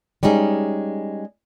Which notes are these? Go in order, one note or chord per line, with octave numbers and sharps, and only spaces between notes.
G3 G#3 C#4 D#4 G#4